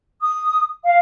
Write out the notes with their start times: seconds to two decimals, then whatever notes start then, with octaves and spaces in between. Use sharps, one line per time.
0.21 D#6
0.84 F5